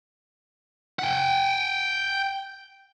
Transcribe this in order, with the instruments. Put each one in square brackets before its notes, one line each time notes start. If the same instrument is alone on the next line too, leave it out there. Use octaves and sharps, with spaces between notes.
[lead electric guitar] F#5 G5